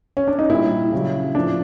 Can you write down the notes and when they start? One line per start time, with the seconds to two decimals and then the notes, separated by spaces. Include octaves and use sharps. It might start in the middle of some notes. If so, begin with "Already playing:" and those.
0.17 C#4
0.28 D4
0.39 D#4
0.49 A#2 G3 E4
0.92 C#3 F#3
1.35 A2 F3 D4